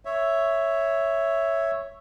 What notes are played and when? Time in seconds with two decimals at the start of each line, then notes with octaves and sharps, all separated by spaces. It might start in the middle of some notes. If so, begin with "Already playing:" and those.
0.05 C#5 E5